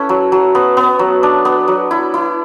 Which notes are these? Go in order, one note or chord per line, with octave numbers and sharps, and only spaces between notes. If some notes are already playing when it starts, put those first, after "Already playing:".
Already playing: C#4 E4 A4 B4
F#3
F#3
B3
B3
F#3
D4
B3
F#3
E4
E4